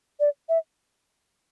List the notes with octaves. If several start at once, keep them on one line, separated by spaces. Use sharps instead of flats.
D5
E5